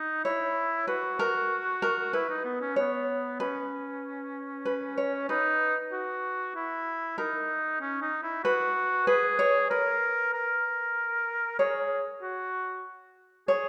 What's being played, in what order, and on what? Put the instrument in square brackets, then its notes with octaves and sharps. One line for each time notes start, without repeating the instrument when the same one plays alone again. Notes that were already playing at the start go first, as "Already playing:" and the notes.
Already playing: [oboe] D#4
[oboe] E4 [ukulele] C#5
[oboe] F#4 [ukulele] B4
[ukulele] A#4
A#4
[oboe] E4 [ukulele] B4
[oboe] D#4
B3
C#4
[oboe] B3 [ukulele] C#5
[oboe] C#4 [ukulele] B4
[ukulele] B4
C#5
[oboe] D#4 [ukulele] B4
[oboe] F#4
E4
[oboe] D#4 [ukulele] A#4
[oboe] C#4
D#4
E4
[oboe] F#4 [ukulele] B4
[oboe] G#4 [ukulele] B4
[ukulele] C#5
[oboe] A#4 [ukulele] B4
[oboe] A#4
[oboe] G#4 [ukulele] C#5
[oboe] F#4
[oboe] G#4 [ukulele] C#5